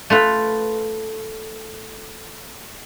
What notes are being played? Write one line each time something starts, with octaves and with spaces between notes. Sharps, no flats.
A3 F4 B4